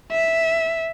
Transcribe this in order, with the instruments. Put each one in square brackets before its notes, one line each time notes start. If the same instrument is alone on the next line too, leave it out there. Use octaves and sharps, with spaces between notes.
[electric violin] E5